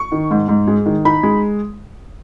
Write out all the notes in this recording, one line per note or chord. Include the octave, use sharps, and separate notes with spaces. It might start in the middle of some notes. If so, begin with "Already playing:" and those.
Already playing: C#6
D#3
G#2
G#2
G#3
D#3
D#4 B5
G#3